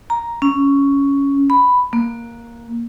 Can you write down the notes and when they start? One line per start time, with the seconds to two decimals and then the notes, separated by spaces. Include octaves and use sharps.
0.10 A#5
0.42 C#4
1.50 B5
1.93 A#3